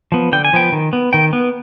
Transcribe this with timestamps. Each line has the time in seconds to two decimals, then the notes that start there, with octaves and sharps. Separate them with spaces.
0.12 F3 B3
0.32 D3 G5
0.45 G#5
0.53 F3 B3 G5
0.72 D#3
0.93 B3
1.13 D#3 G5
1.33 B3